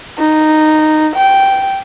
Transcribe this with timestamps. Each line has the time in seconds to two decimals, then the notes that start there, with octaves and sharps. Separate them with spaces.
0.18 D#4
1.16 G5